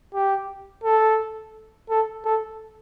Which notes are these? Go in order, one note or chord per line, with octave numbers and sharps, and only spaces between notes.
G4
A4
A4
A4